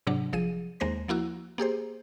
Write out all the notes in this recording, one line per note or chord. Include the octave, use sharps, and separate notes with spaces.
G#2 C3 F#3 D4
G1 F3 G#4 D#7
D#2 G#3 A#3 C5 C6 A#6
F3 A#3 E4 F#4
A#3 G4 G#4 C5